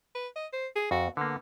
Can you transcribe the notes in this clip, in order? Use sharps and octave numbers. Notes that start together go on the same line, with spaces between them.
B4
D#5
C5
G#4
F2 F#4
D3 A#3 B3